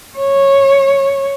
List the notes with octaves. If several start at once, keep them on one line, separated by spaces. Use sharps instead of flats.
C#5